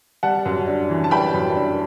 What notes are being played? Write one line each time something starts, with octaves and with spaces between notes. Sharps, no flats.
G3 F#5 A5
F#2
D4
E3
A5
G3 G5 B5
F#2
D4